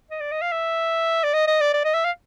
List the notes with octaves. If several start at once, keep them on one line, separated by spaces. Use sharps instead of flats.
D#5
D5
D#5
F5
E5
D5
D#5
D#5
D5
D5
D#5
E5
F5